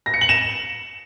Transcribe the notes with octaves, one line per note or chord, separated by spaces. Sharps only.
A#6
C#7
F#7
E7